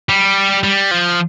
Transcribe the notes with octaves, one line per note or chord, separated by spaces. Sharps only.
G3
G3
F3